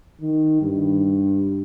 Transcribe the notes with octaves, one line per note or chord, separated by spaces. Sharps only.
D#3
G2